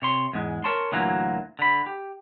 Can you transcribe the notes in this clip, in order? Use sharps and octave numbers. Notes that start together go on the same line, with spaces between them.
C3 C#5 C6
E2 G#2 G#3
A#4 C#5 A5 C6
D2 A#2 E3 F#3 A#3
D3 B5
G4